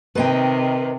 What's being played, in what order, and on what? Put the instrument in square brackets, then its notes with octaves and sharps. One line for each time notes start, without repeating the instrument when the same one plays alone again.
[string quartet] C3 D#3 [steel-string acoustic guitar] B4 D#5 G5